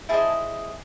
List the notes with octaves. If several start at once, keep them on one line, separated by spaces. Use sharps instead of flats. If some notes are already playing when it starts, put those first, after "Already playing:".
E4 G#4 C5 D#5 A5